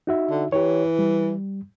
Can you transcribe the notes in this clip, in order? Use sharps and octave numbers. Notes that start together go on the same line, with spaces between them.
D#4 F#4 E5
D3
E3 G4 C#5
G3